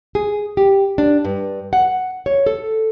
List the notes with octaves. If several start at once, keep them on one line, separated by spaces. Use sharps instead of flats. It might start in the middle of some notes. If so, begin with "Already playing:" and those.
G#4
G4
D4
G2
F#5
C#5
A4